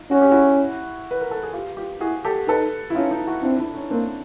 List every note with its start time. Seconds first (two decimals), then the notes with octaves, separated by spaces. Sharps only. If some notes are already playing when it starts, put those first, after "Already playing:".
Already playing: D#4 F4
0.10 C#4 F#4
0.22 G4
0.31 E4 F#4
1.11 B4
1.21 A#4
1.31 A4
1.43 G#4
1.53 F4 G4
1.76 F4 G4
2.00 E4 F#4 G#4
2.25 G4 A4
2.48 D#4 A4 B4
2.90 E4
2.95 C#4 D#4 F4
3.11 D#4 F4
3.27 E4 F#4
3.43 C4 D4 E4
3.58 D4 E4
3.74 C#4 D#4
3.90 A#3 C4 D4